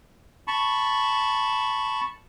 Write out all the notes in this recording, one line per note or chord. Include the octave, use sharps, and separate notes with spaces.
A5 B5 C#6